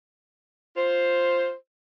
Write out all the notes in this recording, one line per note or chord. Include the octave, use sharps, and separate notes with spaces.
F4 C5